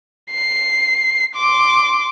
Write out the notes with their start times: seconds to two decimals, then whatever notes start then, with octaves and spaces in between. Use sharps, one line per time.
0.31 C7
1.35 C6 D6